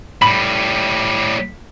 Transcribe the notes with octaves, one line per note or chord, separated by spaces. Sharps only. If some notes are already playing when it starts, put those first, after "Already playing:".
A2 G3 B5